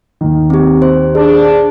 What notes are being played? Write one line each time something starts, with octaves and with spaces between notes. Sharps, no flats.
D#2 D#3
C4 G4
C5
D4 G#4